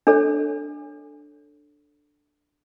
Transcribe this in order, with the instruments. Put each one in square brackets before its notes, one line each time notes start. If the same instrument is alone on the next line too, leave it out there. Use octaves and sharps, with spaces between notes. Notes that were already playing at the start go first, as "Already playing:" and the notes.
[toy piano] D4 A4 C#5